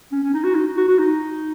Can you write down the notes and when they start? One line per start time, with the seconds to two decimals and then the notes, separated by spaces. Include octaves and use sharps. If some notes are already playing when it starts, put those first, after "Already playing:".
0.12 C#4
0.23 C#4
0.34 D#4
0.44 F#4
0.55 D#4
0.77 F#4
0.88 F#4
0.99 D#4